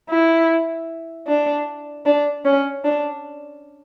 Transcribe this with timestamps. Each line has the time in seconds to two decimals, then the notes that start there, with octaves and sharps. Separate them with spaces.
0.10 E4
1.27 D4
2.06 D4
2.45 C#4
2.84 D4